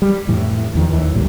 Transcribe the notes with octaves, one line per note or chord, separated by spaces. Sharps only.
G3
F2 A2 E3
E2 D#3 F3
D#2 E3
A1 D2 A#2 G3